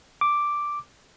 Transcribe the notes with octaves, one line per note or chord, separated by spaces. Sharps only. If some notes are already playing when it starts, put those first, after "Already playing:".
D6